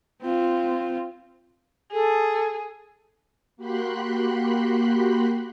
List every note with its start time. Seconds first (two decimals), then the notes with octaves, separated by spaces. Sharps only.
0.22 C4 F4
1.92 G#4 A4
3.57 A#3 F#4 G4 B5 C6 F#6